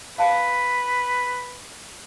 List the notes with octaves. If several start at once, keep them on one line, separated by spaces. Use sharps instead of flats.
B4 F5 A5 F#6